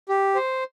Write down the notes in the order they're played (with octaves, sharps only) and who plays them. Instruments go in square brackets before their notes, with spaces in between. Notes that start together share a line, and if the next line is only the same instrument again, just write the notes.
[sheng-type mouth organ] G4
C5